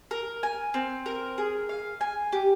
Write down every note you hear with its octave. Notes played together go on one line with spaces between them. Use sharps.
A#4
G#5
C4
A#4
G#4
F5
G#5
G4